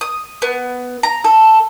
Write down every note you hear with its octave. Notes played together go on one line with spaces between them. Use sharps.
D#6
B3
A#5
A4